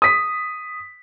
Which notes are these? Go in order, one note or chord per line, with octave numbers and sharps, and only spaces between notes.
D#6 B6